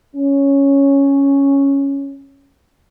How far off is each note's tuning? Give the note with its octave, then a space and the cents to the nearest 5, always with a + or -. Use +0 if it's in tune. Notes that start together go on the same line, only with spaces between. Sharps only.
C#4 +0